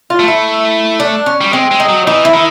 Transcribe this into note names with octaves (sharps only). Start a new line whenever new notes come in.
F4
A3
E4
D4
C#4
G3
G#3 C4
G#3
D#4
F#3
E3 D#4
E4
D#3